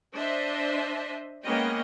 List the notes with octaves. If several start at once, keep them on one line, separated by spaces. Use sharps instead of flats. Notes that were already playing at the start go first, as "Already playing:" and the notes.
D4 C5 D#5 E5
G#3 A#3 B3 C#4 D#5 G5